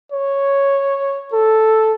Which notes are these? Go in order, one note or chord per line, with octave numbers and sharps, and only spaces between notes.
C#5
A4